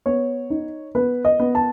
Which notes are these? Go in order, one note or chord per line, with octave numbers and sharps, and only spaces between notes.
B3 C#5
D#4
B3 B4
D#5
B3
A5